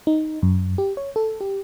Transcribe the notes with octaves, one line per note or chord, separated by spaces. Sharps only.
D#4
F#2
G4
C#5
A4
G4